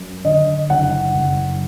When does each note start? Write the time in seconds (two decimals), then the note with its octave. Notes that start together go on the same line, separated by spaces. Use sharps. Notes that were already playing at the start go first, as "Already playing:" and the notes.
Already playing: F#2
0.25 D3 D#5
0.70 F#1 F#5
1.14 F#1